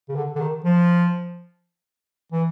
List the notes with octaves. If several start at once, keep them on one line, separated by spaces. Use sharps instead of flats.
C#3
D3
D3
D#3
F3
E3